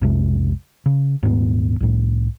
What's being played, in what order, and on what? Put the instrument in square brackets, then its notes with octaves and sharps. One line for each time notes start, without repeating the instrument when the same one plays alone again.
[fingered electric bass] B1 F2 C3 G#3
C#3
D#1 G#2 A3 B3
C2 A2